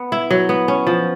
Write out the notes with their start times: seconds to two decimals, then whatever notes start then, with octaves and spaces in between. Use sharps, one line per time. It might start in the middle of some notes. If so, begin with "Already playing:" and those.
Already playing: B3
0.12 E4
0.31 F#3
0.49 B3
0.68 C#4
0.87 F3